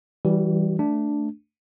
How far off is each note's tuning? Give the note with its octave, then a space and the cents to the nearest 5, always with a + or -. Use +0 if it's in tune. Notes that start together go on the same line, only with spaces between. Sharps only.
E3 -10 G3 -10 F#4 +30
A3 +0 D4 +0